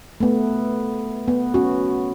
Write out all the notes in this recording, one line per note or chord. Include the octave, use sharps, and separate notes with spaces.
A3 B3
B3
C#4 F#4